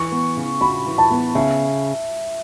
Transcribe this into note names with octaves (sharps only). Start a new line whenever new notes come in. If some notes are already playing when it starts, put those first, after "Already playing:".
Already playing: E3 C#6
B3
C#3
F#4 B5
E3
A5
B3
C#3 E5